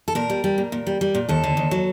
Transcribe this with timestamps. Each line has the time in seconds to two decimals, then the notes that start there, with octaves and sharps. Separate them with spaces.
0.08 A4
0.15 A#2 A#4
0.30 G3
0.44 G3
0.58 A#2
0.72 A#2
0.87 G3
1.01 G3
1.15 A#2
1.29 D#2 A4
1.44 D3
1.57 D#2
1.71 F#3